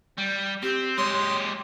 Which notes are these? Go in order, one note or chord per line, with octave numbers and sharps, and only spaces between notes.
G3
C4 G4
G#3 G4 C#5 C6